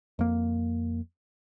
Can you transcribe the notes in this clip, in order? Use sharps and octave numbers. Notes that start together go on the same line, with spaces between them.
F2 A#3